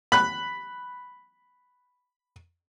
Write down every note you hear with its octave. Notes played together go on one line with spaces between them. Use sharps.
B5 F#6